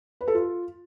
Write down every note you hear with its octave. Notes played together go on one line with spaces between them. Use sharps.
B4
A4
F4